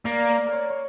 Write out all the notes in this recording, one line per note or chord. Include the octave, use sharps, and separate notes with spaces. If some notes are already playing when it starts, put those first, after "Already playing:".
A#3 D5
D5
A#4
C#5
C#5